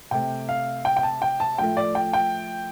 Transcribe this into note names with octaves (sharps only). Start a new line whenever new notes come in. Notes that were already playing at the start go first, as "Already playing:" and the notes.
C3 A3 G5
F5
G5
G5
A5
G5
A5
A2 F3 A3 G5
D5
G5
G5